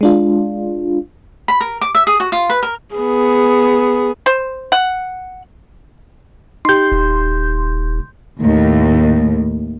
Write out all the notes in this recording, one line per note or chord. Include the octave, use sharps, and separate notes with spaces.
G#3 D4 F4
B5
A#4
D6
E5
G#4
F#4
F4
B4
A#4
B3 G#4
C5
F#5
D#4 G4 C6 G6
D#1
D#2 A2